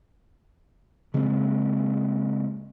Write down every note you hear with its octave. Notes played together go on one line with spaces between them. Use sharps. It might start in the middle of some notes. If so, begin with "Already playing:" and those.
C#3 G#3 A#3 C4